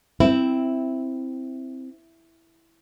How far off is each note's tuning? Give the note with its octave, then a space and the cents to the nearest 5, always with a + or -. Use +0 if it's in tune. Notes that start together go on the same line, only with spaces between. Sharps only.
C4 +0 E4 +0